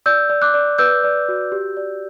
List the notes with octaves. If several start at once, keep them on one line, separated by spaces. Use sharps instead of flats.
D5 E6 G6
D5
D6 F#6
D5
B4 E6 G6
D5
F#4
G4
D5